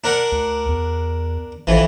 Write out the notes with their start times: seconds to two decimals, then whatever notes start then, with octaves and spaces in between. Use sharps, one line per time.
0.04 D4 A#4 F#5
0.32 D2
0.69 E2
1.67 A1 F2 E3